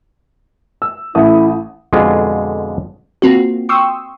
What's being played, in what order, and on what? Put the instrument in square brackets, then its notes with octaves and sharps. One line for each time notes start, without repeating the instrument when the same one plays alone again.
[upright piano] E6
[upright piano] A1 A3 D#6 [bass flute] E4
[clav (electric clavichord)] F2 B2 D3 G#3 F4
[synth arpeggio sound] A#3 C4 F4 F#4
G5 C6 C#6 D#6 E6